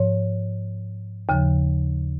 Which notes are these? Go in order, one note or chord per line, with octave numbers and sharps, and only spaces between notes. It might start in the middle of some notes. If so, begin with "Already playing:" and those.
Already playing: G#2 F3 C#5
D#2 C#3 F3